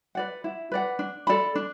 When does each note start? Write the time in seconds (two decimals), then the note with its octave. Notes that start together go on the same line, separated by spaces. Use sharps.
0.15 B4 D5 F#5
0.44 E4
0.72 B4 D5 F#5
0.99 D4
1.27 A4 D5 B5
1.55 D4